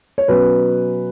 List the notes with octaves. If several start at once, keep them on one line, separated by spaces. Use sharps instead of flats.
C#5
B2 F#3 C#4 B4